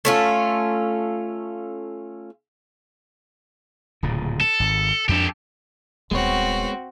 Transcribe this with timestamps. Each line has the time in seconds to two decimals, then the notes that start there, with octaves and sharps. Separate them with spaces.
0.05 A3 C#4 F4
4.03 D1 A#2 C#3
4.41 A4
4.60 G#1
5.09 F2 D4 G4 A4
6.11 D#1 G#3 B3 C4 F#4 C#5